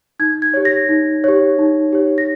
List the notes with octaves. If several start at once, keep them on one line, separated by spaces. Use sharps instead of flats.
D#4 G#6
G#6
G4 C#5
A#6
D#4
G4 C#5
D#4
G4 C#5
A#6